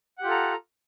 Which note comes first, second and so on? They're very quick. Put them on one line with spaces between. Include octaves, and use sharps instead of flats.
F#5 G4 F4 A4 A#5